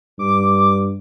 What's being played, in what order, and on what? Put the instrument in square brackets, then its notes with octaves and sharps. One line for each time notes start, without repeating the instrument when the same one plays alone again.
[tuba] G2 [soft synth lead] D6